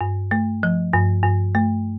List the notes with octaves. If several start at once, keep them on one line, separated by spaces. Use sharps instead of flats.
G2
A3
F3
G2
G2
A3